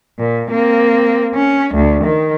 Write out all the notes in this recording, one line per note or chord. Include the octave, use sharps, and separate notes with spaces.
A#2
A#3 C4
C#4
D2
D#3